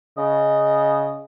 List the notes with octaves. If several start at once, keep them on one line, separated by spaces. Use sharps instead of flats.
C#3 D#5